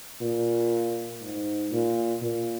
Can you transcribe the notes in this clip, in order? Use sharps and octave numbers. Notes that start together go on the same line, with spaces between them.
A#2
G#2
A#2
A#2